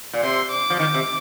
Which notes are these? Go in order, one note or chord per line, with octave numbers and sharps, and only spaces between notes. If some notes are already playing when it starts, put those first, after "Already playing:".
A#2
C3 C6
D6
F3
D#3 D6
C3